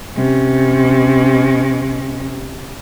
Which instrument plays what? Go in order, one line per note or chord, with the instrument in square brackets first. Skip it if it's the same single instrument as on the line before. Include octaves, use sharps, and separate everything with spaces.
[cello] C3 C#4